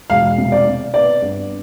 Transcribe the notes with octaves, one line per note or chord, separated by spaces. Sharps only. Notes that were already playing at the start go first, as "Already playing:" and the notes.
E1 F5
C3
D5
C3
B3 D5
G2